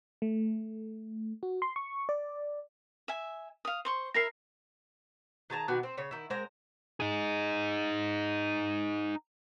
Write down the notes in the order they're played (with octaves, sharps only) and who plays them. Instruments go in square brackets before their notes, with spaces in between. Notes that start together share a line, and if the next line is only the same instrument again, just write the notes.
[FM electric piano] A3
F#4
C6
C#6
D5
[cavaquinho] E5 G#5
F5 D#6
C5 C6 C#6
[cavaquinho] E4 A#4 E5 [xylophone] A#6 C7
[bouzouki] D#3 G#4 A5 A#5
B2 D#3 F#4 G4
C4
C#3 C#5
D#3 E4
G#3 C4 A#4 A#5
[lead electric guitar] D#4 G#4